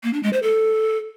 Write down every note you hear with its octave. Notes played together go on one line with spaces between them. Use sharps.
A#3
D4
G#3
C5
A4